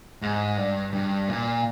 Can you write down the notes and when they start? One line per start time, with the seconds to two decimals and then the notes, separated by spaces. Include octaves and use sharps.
0.22 G#2
0.57 G2
0.93 G2
1.28 A#2